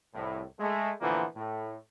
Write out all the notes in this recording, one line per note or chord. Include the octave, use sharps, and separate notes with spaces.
C2 A2
G#3 A3
A#2 D3 E3 F3 A#3 B3
A2